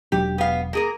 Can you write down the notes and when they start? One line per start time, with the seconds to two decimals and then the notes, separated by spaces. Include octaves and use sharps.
0.12 E1 F#3 D4 G4
0.38 B3 F5
0.73 A#3 G#4 A#4